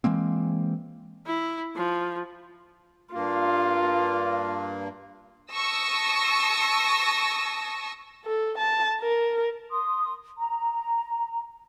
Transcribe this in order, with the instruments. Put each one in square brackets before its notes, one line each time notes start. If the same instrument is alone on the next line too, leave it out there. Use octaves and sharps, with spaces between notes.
[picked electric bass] E3 G#3 A#3 C4
[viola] E4
F3
[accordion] G2 A#3 [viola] F4
[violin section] A5 C#6 D#6 E6 A#6
[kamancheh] A4
A5
A#4
[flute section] C6 D#6
A#5